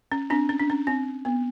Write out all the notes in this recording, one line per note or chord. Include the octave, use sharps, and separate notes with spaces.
C#4
C4 D4
C#4
D4
C#4
C4
B3